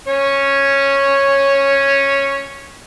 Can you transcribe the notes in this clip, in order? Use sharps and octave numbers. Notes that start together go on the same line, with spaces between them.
C#4 C#5